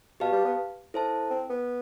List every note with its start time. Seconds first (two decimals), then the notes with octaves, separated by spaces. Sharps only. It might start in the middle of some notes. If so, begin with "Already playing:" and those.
0.20 B2 G4 B4 F5 A5
0.32 G3
0.45 B3
0.94 E4 A4 C5 E5 A5
1.30 C4
1.50 B3